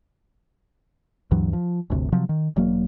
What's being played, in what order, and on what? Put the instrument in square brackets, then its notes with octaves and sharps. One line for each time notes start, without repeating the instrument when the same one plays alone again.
[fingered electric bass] D2 G2 E3 F#3
F3
G1 D2 C3
C3 F3 F#3
D#3
E1 F#3 A#3